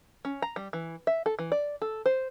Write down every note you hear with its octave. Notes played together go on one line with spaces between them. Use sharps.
C#4
A#5
G3
E3
E5
A4
E3
D5
A4
C5